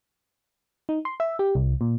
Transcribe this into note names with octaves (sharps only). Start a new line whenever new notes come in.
D#4
C6
E5
G4
C2
A#2